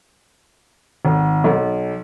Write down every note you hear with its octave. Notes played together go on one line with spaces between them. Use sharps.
G#1
B1